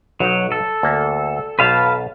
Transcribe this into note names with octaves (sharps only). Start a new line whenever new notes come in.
B1 F#3 D#4 F#5
A4
D2 A#3
B1 B2 B4 F5 A5